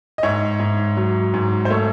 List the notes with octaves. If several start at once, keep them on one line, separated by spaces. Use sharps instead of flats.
D#5
G#2 C#5 E5
G#2
F#3
G#2
C5
A3 A4 C#5